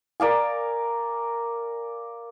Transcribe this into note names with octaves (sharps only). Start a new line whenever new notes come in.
A#4 D5 F5 G#5